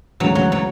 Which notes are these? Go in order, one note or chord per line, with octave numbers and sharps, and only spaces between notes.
D2 C#3 E3 F#3 G#3
F#3
F#3